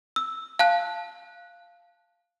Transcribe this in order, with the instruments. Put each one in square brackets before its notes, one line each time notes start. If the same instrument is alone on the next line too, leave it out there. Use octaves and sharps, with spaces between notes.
[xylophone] E6
F5 A5 F#6